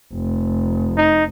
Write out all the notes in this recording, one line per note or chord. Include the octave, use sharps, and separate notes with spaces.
F1
D#4